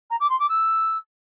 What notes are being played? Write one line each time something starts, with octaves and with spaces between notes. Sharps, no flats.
A#5
D6
C6
D6
E6